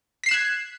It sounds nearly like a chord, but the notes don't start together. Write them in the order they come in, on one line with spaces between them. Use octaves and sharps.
B6 C7 E7 F#6 G#6